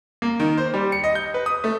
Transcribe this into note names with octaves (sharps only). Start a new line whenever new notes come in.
A#3
D#3
C5
G3
C#7
D#5
G6
B4
D#6
A3